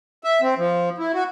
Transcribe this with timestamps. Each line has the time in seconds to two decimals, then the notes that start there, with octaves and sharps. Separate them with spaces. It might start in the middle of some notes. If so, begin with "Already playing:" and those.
0.24 E5
0.42 C4
0.58 F3
0.98 E4
1.14 F#4